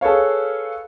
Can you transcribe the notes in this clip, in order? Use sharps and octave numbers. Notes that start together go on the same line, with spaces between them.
G#4 A4 B4 C#5 F5